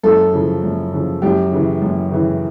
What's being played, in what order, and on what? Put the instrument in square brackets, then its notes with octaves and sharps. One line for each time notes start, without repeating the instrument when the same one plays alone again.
[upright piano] F#2 A4
C#3 F3
F#2
C#3 F3
F#2 G4
C#3 E3
F#2
C#3 E3